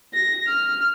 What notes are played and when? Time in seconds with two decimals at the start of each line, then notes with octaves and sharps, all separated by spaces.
0.14 A#6
0.48 F6